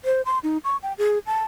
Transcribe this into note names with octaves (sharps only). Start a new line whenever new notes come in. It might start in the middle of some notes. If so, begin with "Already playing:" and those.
C5
C6
D#4
C#6
G5
G#4
A5